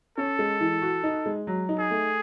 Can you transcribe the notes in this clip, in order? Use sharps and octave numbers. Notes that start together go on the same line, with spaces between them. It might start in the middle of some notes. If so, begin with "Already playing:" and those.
C#4 A4
G#3
E3
F#4
D#4
G#3
F#3
D#4
G#4
A3